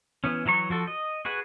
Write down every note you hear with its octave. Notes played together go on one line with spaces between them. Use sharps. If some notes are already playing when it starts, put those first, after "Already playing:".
E3 B3 C#4
E3 F#3 A#5 C#6
F3 F#4 A4
D#5
F#4 G#4 B4 F#5